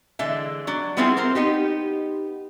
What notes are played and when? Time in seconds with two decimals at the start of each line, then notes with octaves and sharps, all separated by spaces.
0.19 D3 E3 G#3 E5
0.67 F#3 D4
0.97 G3 B3 C4 E4 F4 G#4
1.17 C4 A#4 C5
1.35 B3 D#4 G4